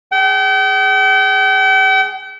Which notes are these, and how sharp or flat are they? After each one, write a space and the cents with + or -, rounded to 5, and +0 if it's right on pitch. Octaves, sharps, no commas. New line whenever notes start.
G#4 +0 G5 -40